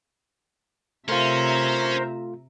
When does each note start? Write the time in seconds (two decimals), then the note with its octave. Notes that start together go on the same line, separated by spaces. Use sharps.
1.08 C3 A3 C#4 F4 A#4 C5 E5 A#5